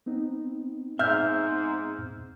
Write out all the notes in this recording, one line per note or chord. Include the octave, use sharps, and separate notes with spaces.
B3 C4 D#4
G#2 E5 E6 F6 G6